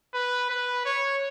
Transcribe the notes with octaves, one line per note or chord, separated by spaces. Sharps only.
B4
B4
C#5